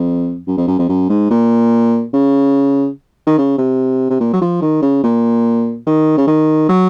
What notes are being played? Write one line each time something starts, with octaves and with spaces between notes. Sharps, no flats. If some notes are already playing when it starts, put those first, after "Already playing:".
Already playing: F2
F#2
F2
F#2
F2
F#2
G#2
A#2
C#3
D#3
C#3
C3
C3
A#2
F#3
F3
D#3
C#3
A#2
D#3
C#3
D#3
F#3